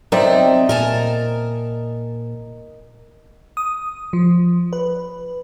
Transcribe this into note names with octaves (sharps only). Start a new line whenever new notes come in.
C3 F#3 C4 D#4 C5 D5 E5 G5
A#2 A#4 G#5 A5
D#6
F3
B4